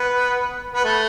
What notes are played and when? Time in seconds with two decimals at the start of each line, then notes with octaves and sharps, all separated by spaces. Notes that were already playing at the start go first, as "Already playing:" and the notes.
Already playing: B3
0.74 B3
0.84 A3